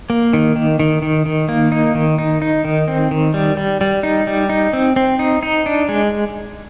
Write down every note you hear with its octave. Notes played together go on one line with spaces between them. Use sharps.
A#3
D#3
D#3
D#3
D#3
D#3
A#3
D#4
D#3
D#4
D#4
D#3
C4
D#3
G3
G3
G3
D#4
G3
D#4
C4
C4
D#4
D#4
D4
G#3